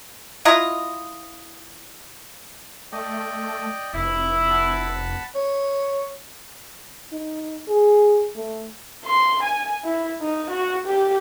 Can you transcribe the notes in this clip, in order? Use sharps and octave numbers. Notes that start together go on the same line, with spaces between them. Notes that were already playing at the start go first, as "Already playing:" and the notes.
E4 F4 D#5 A#5
A3 D5 D#5 G5
F1 E4
F#5 A5 B5
C#5
D#4
G#4
A3
C6
G#5
E4
D#4
F#4
G4